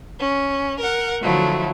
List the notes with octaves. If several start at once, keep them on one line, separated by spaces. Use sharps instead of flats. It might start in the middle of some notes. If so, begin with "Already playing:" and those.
C#4
A#4 F#5
D3 F3 F#3 A3 E4